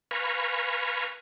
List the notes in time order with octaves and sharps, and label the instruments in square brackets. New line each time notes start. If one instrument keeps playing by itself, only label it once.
[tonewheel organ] B4 F5 G#5 A#5 B5 C#6